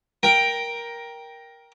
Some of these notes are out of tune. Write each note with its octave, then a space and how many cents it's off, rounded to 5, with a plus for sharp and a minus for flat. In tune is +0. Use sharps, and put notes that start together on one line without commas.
A#4 +10 G5 +5